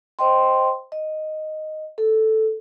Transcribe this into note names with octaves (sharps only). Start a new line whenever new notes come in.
C5 D#5 G5 C6
D#5
A4